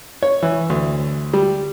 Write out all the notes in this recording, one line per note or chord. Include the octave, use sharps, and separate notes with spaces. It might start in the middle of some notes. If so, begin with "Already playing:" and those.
C#5
E3
D2
G3